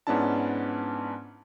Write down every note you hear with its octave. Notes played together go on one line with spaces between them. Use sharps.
G#2 B3 C#4 D4 E4 A5